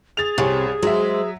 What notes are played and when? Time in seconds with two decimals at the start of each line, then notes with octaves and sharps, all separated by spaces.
0.17 G#4 A6 F7
0.38 C2 C3 C#5 G#5
0.82 F#3 G#3 C5 E5